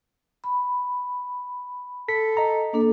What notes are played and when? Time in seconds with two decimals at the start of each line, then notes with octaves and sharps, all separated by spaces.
0.44 B5
2.09 A4 B6
2.37 D#5 A#5
2.73 A#3 D4 A4